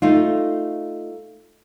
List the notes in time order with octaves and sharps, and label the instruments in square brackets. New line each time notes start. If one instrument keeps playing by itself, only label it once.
[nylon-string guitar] A3 D#4 F4